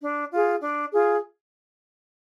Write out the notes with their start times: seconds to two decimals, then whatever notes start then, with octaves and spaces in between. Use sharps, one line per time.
0.01 D4
0.31 F4 G#4
0.62 D4
0.92 F4 G#4